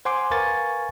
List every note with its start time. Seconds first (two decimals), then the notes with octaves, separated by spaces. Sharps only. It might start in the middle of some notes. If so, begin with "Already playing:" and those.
0.05 C5 F#5 G#5 C6 D6
0.31 A#4 B4 F5 G#5 C#6 A6